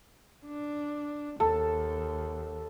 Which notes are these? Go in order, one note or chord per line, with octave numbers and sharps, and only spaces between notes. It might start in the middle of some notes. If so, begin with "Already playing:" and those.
D4
D#2 A4